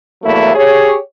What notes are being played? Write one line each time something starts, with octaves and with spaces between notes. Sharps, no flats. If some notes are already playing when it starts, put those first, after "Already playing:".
E2 F#3 A3 A#3 E4
G4 G#4 C#5